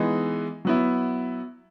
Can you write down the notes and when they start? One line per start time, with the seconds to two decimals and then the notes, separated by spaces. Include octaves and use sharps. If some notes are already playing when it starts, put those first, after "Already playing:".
Already playing: E3 G#3 B3 D#4
0.65 F#3 B3 E4